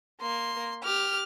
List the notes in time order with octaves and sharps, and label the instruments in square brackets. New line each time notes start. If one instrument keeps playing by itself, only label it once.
[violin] A#3 [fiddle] C6
[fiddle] G4 [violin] F6